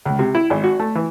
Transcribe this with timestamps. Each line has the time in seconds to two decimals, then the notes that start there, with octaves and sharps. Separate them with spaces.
0.06 C#2
0.19 C3
0.35 E4
0.50 G#1
0.64 F#4
0.80 A3
0.95 E3